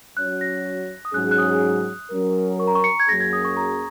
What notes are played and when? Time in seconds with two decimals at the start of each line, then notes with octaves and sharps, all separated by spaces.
0.16 F#3 C#4 F#4 C#5 F#6
0.41 A#6
1.05 D#6
1.13 G#2 F#3 C#4 G#4 F#6
1.31 F#6
1.38 D#6
2.11 F#3 C#4 A#4
2.60 C#6
2.68 A#5
2.75 C#6
2.84 C#7
3.00 G#6
3.08 F#2 F#3 A#3 C#4 G#4 A#6
3.20 G#6
3.33 D#6
3.45 C#6
3.57 A#5